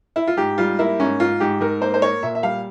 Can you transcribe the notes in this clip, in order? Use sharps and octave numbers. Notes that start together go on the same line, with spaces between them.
E4
F4
G#2 G4
G3 F4
A#3 E4
G#2 C#4
G#2 F4
G#2 G4
G#2 A#4
A#3 C5
C5
A#3 C#5
A#2 E5
E5
G3 F5